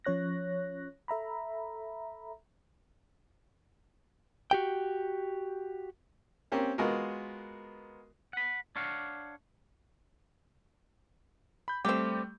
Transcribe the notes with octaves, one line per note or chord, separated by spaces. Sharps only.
F3 C#4 C#5 F#6 A#6
A4 E5 A#5 B5
F#4 G4 G5
A#3 C4 C#4 G4
G#3 B3 F4 F#4 A#4
F#5 B5
D4 C#5 F5 F#5
B5 G6
G3 A3 C4 G4